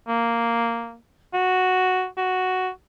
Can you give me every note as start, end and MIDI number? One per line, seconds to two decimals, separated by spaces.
0.08 0.97 58
1.34 2.06 66
2.17 2.70 66